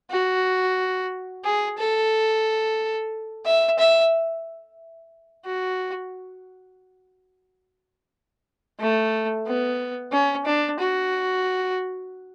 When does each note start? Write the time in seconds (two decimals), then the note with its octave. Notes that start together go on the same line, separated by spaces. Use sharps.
0.11 F#4
1.45 G#4
1.78 A4
3.46 E5
3.79 E5
5.45 F#4
8.79 A3
9.46 B3
10.12 C#4
10.46 D4
10.80 F#4